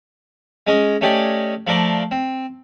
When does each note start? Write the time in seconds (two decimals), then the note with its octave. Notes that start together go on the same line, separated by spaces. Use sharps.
0.67 G#3 C#4 D#5
1.01 A3 C#4 G4 D5 D#5 G#5
1.67 F3 A3 A#4 D5 C6
2.11 C4